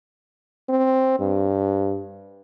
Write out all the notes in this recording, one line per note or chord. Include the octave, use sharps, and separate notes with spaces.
C4
G2